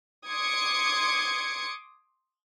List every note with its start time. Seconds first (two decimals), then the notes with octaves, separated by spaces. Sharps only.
0.26 C6 D6 D#6 G#6 C#7